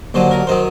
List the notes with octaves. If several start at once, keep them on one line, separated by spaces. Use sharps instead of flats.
D#2 D3 F#3 C5
A#4
D#3 F#3 C5